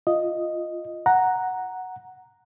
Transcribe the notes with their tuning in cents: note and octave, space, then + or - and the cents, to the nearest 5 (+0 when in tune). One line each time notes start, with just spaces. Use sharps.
F4 +0 D#5 +0
F#5 +0 A#5 +0